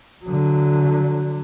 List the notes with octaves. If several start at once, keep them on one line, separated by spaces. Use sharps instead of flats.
D3 F#3